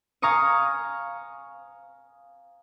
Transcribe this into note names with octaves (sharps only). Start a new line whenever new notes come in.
F5 G#5 A#5 C#6 D#6